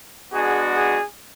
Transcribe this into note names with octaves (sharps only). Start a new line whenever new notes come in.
G#3 B3 D4 F#4 G#4
G#4